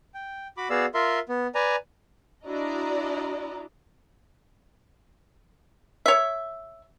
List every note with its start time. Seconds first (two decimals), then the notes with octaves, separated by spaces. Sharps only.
0.14 G5
0.57 F#4 B5 D6
0.70 B3 F#4 G#4 D5 F5 E6
0.94 F4 A#4 E5 C6
1.29 B3
1.55 B4 D5 G#5 A#5
2.45 D4 E4 F#4 D5 D#5 A#5
6.06 C#5 E5